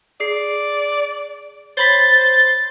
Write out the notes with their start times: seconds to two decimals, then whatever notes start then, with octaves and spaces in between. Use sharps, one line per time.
0.20 G#4 D5 C7
1.77 C5 C#5 B5 A6 B6